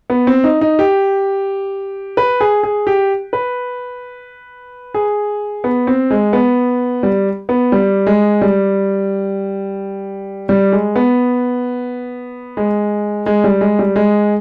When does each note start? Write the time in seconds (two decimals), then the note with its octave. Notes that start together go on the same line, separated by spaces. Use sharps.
0.10 B3
0.27 C4
0.44 D#4
0.61 D#4
0.79 G4
2.17 B4
2.41 G#4
2.63 G#4
2.87 G4
3.33 B4
4.94 G#4
5.64 B3
5.87 C4
6.11 G#3
6.33 B3
7.03 G3
7.49 B3
7.72 G3
8.07 G#3
8.41 G3
10.49 G3
10.72 G#3
10.96 B3
12.57 G#3
13.26 G#3
13.44 G3
13.61 G#3
13.79 G3
13.96 G#3